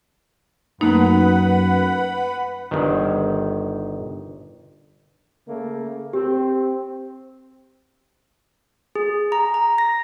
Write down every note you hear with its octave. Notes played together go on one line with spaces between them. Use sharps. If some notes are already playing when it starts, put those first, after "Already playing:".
F#2 A3 A#3 D#4 B4 F#5 B5
G1 D#3
C#3 A3 A#3
C4 G4
G#4
A#5
A#5
A#6